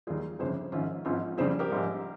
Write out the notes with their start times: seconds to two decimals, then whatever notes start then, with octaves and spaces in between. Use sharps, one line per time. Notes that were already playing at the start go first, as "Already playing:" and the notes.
0.07 D#2 D#3 G3 F4 G#4
0.39 G1 F2 C#3 G#4 C5
0.72 A#1 G#2 D#3 C#4 F4
1.05 G#1 G#2 F3 C#4 F4
1.38 F2 C#3 G3 G#4 C5
1.59 G4 A#4
1.70 A#1 G#2 G3